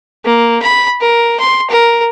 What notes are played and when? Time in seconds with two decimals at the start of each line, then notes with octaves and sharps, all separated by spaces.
0.24 A#3
0.62 B5
1.01 A#4
1.39 C6
1.70 A#4